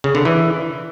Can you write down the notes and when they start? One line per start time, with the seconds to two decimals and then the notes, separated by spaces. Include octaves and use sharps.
0.04 C#3
0.15 D3
0.25 E3